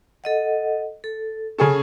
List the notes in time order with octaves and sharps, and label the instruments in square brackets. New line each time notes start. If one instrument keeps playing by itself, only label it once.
[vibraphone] A4 D#5 F#5
A4
[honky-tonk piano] C#3 G#4 A4 [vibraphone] C#4